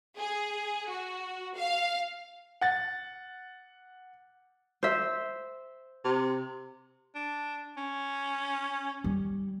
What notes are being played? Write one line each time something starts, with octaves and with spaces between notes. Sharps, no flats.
G#4
F#4
F5
F#5 A6
C5 E5
C3
D4
C#4
G3